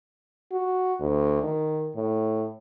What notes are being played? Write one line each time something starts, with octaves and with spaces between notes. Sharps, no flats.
F#4
D2
D#3
A2